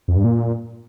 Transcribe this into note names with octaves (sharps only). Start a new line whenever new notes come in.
F2
G2
A#2